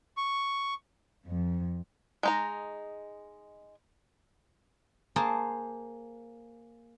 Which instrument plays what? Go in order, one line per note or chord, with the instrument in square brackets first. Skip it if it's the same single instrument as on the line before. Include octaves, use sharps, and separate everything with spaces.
[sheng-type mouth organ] C#6
[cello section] F2
[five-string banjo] G#3 D#4 A#5
[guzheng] A#3 G#4 A#4 C5 A5